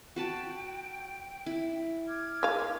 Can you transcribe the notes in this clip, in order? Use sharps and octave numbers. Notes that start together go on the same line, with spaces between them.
F#4 B4 G5 A5
E4
D6 F6 G#6
G#3 F5